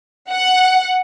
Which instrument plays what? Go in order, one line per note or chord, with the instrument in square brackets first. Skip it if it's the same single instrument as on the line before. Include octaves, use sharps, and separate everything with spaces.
[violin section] F#5